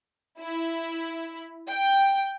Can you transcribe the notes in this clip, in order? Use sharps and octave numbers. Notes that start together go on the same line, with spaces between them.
E4
G5